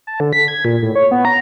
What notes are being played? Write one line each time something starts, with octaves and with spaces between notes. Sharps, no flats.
A5
D3
B6
G#6
A#2
A2
C#5
B3
A#5